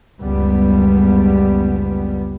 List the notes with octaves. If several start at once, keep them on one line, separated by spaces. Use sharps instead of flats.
F#1 C#2 G3 B3